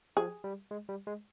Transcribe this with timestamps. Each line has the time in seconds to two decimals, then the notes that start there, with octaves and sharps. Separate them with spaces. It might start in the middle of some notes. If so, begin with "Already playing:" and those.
0.17 F3 G#4
0.44 G3
0.71 G#3
0.89 G3
1.07 G#3